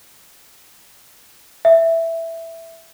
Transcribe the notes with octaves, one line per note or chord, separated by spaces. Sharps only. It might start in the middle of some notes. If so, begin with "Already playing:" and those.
E5